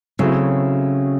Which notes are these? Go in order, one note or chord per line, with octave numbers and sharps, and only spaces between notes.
C#3 F#3 A3 C4 E4